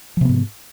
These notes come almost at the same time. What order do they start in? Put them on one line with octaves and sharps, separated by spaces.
F3 C3 B3 G#2